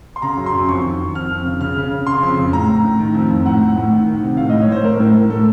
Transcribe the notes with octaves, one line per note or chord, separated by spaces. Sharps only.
C6
C#3 A#5
F#2
C6
F#2
F2 C#6
D#3
D#3
F2 F6
F2
C#3
C#3 F6
C#3
C#3
C#3 C6
F2
C#3
A2 A#5
A2
A2
D#3
F2
F2
A2 F#5
A2
A2
D#3
D#3
C3
A2 F5
A2 D#5
C#5
A2 C5
A2 A#4
A2
A2
A2 A4